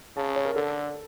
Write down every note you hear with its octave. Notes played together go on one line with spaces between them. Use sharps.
C#3 A5
C#5
A#4
D3 A4